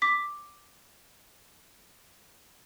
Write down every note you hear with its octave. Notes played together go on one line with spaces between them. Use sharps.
D6 B6